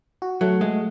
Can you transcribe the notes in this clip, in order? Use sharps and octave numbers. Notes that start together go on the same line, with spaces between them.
F#4
F#3 A3
G#3 A3